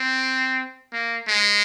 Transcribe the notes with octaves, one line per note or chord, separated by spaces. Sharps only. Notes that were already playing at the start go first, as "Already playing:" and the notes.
Already playing: C4
A#3
G#3